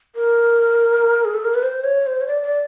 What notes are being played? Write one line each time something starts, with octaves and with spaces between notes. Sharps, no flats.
A#4
G#4
A4
A#4
B4
C5
C#5
C5
C#5
D5
D5